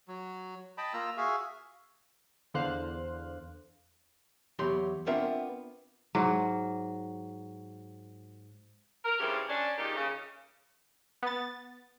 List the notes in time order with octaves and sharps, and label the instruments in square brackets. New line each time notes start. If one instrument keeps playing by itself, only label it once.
[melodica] F#3
D#5 G5 A5 B5
A#3 F4 A#5 E6
F#4 G#4 E5 F5
[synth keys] E2 D3 C5 F5 F#6
[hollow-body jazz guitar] E2 F#3 G4 B5 C6
B3 C4 D4 F4 A#4 E5
[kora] G#2 F#3
[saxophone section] A#4
G2 C#3 E3 F3 C4 G4
C#4 D4
A#2 D#3 G#3 D#4 G4
C#3
[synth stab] B3 A6